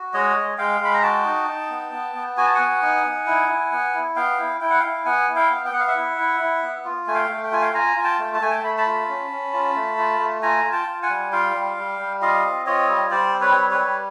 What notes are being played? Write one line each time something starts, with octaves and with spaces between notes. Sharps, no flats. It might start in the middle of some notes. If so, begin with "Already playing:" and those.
Already playing: F#4
G#3 C#5 D#5
G#3
G#3 F5 G5
G#3 B5
A#5
F#4 G5 A5
D#4
D#4
B3
B3
B3
F#4 G#5
A5
B3 F#5 G#5
D#4
D#4
E4
E4
B3
E4
B3 F5 G5
E4
E4 G5
F#5
E4 F5 G5
B3 F#5 G#5
E4
F5 G5
B3
G5
B3 F#5
F5
E5 F#5
E4
E4
E4
B3
F4
A3 G#5
F5 G5
A3
G5
F4 G#5
F5 G5
F4 G#5 A#5
F4 G#5
G5 A5
A3
A5
A3 G#5
G5 A5
A3 B5
A5 B5
F4
C#4
C#4
F4
A3
F4
A3
F4 G#5 A#5
F4
G5 A5
F4
F#5 G#5
G3
F4 F5 G5
G3
G3
G3
F4 D#5 F5
C4
F4 C#5 D#5
G3
G3 C5 D5
C4
B4 C#5
G3
B4 C#5
G3